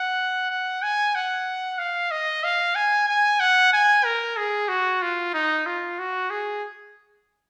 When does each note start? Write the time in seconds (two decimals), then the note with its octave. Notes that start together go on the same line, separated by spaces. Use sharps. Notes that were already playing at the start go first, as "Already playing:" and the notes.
Already playing: F#5
0.50 F#5
0.83 G#5
1.15 F#5
1.79 F5
2.11 D#5
2.44 F5
2.76 G#5
3.08 G#5
3.40 F#5
3.73 G#5
4.05 A#4
4.37 G#4
4.69 F#4
5.02 F4
5.34 D#4
5.66 F4
5.99 F#4
6.30 G#4